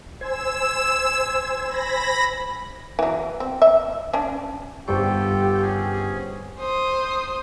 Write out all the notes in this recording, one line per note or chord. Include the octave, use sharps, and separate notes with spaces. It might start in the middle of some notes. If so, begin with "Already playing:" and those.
C5 G#5 E6 E7
B5 A#6
E3 F#3
C4
E5
C#4 D4
G1 G3 F4 G4 A4 C5 G5 C#6
C#4 G#4
C5 D#6